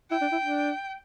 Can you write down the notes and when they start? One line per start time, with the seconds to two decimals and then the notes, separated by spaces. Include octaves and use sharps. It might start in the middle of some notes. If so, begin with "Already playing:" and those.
0.11 E4 G5
0.21 D4
0.32 E4
0.42 D4